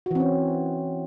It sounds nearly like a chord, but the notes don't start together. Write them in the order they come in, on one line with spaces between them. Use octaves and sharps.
F#4 E3 C4 C#4